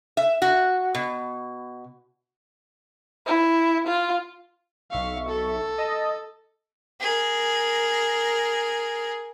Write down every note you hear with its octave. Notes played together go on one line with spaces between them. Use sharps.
E5
F#4
B2
E4
F4
B1 E5 F5 C#6
A4
D#5 A5
G#4 A#4